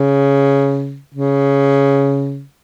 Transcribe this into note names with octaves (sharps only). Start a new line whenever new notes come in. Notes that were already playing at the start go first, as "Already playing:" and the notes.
Already playing: C#3
C#3